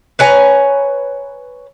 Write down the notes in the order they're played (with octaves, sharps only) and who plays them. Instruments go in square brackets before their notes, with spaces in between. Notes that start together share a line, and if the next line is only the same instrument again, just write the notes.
[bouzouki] B4 C#5 G#5 A#5